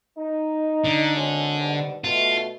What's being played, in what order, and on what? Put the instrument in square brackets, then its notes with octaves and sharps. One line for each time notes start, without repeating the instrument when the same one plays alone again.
[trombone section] D#4
[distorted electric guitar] D3
[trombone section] G#1 G#3 C#4
G#2 B2 G3
[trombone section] B2 A3 [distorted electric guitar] F4